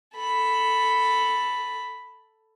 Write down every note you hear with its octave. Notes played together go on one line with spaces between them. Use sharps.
A4 B5